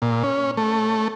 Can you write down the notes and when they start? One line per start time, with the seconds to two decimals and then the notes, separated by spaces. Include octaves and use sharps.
0.02 A#2
0.23 C#4
0.57 A3